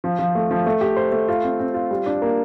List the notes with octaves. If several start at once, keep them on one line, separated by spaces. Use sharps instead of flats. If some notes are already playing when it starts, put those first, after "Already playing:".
F3
F3
A3
F3
A3
G4
C5
A3
F4
C4
C4
F4
G3
D4
A#3